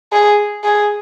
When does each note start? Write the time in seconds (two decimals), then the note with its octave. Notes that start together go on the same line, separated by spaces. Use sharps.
0.12 G#4
0.64 G#4